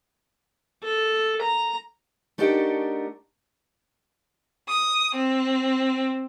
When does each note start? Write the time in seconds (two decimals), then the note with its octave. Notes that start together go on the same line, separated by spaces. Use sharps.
0.83 A4
1.42 A#5
2.38 A3 D4 D#4 F#4 G4 A#4
4.68 D#6
5.14 C4